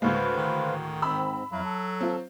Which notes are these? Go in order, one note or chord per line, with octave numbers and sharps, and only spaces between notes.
D2 A2 G#3 B4 C5 F5
D#3
G#2 C4 B5 E6
F2 F#3 E4 F5
A4
C4 F4